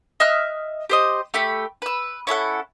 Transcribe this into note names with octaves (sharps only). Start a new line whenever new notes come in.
D#5 E5 F6 F#6
G4 C5 D#5
A3 G4 B5
B4 E6
C#4 E4 A4 F#5